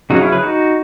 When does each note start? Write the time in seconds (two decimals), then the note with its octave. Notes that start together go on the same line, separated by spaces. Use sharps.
0.10 C#3 F#3 C#4 D#4 F#4
0.21 C#4 E4
0.32 G#4 B4
0.42 D#4 F#4